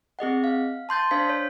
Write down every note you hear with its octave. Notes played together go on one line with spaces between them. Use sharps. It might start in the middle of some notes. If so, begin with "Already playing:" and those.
C4 G#4 D#5 F#5
F5
A5 C6 G6 A6
D4 C5 F5 B6
C#5